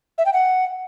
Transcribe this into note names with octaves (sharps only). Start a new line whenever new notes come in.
E5
G5
F#5